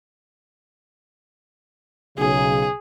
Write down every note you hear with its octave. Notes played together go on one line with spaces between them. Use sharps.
B1 C#3 G#4